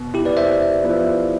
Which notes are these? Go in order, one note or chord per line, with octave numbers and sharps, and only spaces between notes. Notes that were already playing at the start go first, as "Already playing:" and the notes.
Already playing: B2
E4 G4
B4 D5
C5 E5
F3 B3 E4